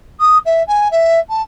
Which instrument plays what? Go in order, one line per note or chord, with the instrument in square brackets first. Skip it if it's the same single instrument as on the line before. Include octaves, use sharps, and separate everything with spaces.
[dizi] D#6
E5
G#5
E5
A5